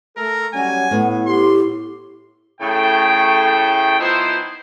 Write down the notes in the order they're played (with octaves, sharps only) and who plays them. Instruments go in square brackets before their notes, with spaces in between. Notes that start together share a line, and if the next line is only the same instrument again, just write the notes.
[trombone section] A3 A4 [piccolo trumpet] A#4
[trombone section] F#3 G3 C#4 [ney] F#5 [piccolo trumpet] G#5
[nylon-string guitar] A2 [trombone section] B3
[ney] G4 [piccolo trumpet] C6
[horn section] A2 C#3 A3 G5
F3 B3 D#4 E4 C5